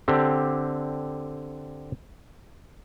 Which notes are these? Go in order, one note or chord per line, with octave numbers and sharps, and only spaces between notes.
D3 C4 G4